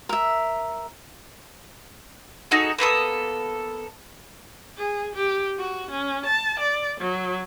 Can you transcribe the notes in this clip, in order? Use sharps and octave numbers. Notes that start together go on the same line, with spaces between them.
A#4 E5
D#4 F#4 G#4 A4
A#3 B3 A4 D#6
G#4
G4
F#4
C#4
A5
D5
F#3